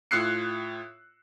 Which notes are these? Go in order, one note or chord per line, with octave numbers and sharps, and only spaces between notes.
A2 F4 E6 F#6 C7 C#7